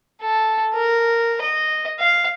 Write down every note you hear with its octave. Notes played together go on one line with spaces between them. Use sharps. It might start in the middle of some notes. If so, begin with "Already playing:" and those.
A4
A#4
D#5
F5